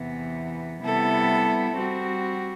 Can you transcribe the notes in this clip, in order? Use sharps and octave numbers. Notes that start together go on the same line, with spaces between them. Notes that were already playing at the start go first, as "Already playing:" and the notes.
Already playing: E2 C3 E3 B3
C3 G3 B3 E4 A4
G3 C4 F#4